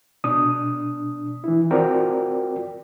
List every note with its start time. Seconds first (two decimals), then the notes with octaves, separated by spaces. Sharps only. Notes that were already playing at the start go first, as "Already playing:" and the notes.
0.24 B2 D4 D#6
1.44 E3 E4
1.71 C4 F4 F#4 A#4 D5 G5